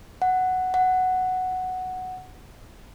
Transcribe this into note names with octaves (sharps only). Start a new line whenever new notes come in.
F#5
F#5